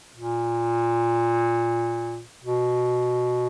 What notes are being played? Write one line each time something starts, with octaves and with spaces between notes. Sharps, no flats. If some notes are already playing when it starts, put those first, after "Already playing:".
A#2
B2